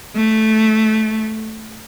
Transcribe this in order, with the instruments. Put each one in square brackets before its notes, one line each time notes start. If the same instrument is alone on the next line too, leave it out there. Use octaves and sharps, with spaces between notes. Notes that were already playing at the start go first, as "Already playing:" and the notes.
[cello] A3